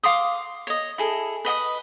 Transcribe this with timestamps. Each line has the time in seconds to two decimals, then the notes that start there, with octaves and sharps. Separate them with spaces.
0.03 F5 C6 D6 D#6
0.67 C#5 D#5
0.98 E4 G#4 A4
1.45 B4 D#5 F#5 D#6